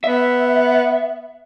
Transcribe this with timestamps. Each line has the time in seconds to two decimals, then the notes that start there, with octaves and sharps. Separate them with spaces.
0.04 B3 E5